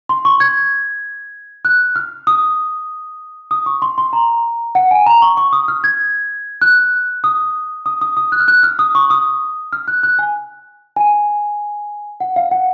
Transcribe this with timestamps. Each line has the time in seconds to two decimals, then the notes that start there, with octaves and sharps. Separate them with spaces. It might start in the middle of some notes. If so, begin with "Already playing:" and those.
0.09 C6
0.25 C#6
0.40 G#6
1.65 F#6
1.96 F6
2.27 D#6
3.51 D#6
3.66 C#6
3.82 C6
3.98 C6
4.13 A#5
4.75 F#5
4.91 G#5
5.06 A#5
5.22 C#6
5.37 C#6
5.53 D#6
5.68 F6
5.84 G#6
6.62 F#6
7.24 D#6
7.86 D#6
8.01 D#6
8.17 D#6
8.32 F#6
8.40 F6
8.48 F#6
8.63 F6
8.79 D#6
8.95 C#6
9.10 D#6
9.73 F6
9.88 F#6
10.03 F#6
10.19 G#5
10.96 G#5
12.20 F#5
12.36 F5
12.51 F#5